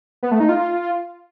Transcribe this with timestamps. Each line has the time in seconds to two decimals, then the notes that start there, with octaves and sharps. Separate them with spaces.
0.23 B3
0.31 A3
0.40 D#4
0.49 F4